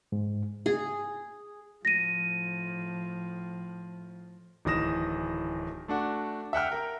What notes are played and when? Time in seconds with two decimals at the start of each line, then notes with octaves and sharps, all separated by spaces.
0.12 G#2
0.66 G#4
1.85 A2 F3 A#6 D#7
4.65 D1 D#3 E3 D#6 A#6 E7
5.88 A3 D4 F#4
6.53 E5 F#5 G5 F6
6.71 A#4